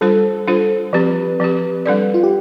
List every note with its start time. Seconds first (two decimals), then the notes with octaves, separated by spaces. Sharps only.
0.01 G3 D4 F4 A4 C5
0.47 G3 D4 F4 C5
0.93 F3 C4 G4 B4
1.40 F3 C4 G4
1.86 G3 D4 A4 D5
2.14 F4
2.23 G4